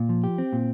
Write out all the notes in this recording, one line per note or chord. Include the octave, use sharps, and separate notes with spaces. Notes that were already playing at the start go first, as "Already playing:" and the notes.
Already playing: A#2
F3
G4
C4
A#2